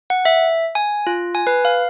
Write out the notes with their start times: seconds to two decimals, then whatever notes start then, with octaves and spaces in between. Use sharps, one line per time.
0.10 F#5
0.25 E5
0.75 G#5
1.07 F4
1.35 G#5
1.47 B4
1.65 F5